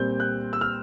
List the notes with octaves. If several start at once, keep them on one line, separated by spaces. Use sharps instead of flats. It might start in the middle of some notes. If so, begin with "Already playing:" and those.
Already playing: A#2 G3 C4 G6
F#6
E6
F6